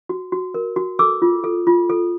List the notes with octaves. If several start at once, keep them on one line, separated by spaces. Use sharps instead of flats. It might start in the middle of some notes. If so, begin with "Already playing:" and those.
F#4
F#4
A#4
F#4
A4 D6 E6
F4
A4
F4
A4